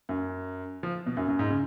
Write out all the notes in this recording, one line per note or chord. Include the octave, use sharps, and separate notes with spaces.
F#2
F3
B2
F#2
F#2
G#2
C#3